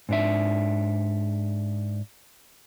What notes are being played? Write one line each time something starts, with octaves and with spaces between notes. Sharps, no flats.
G#2 D4 E5